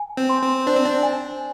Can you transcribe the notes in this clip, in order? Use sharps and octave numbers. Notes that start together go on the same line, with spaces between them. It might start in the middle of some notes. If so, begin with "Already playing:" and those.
Already playing: G#5
C4
C6
C4
D4 C5
C4
D4
G#5